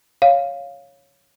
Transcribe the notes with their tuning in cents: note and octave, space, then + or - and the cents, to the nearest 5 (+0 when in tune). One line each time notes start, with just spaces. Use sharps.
C#5 +0 F5 +0